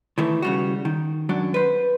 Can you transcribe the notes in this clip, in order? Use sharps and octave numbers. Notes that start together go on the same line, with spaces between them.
D#3 E3 A3
C#3 G3 F#4
D#3
F#2 F#3 D4
B4 C5